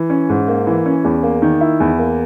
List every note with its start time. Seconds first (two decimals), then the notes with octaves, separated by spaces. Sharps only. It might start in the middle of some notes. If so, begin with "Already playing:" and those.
Already playing: E3
0.10 C#4
0.29 G#2
0.48 A#3
0.67 E3
0.86 C#4
1.04 E2
1.23 A#3
1.42 D#3
1.61 E4
1.80 E2
1.99 A#3